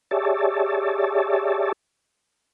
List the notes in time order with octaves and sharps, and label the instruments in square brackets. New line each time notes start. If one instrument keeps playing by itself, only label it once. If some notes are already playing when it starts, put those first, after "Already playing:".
[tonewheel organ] G4 G#4 C#5 D5 E5 A5